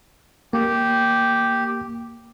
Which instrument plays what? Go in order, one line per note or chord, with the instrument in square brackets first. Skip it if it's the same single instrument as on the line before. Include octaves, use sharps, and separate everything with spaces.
[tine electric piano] A#3 [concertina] G4